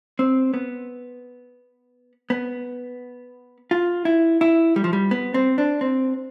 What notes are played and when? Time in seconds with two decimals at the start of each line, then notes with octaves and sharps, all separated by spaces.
0.19 C4
0.54 B3
2.30 B3
3.71 F4
4.05 E4
4.41 E4
4.76 G3
4.84 F3
4.93 G3
5.11 B3
5.34 C4
5.58 D4
5.81 C4